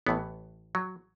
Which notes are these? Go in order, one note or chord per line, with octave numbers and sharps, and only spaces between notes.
A1 A2 E3 B3
F#3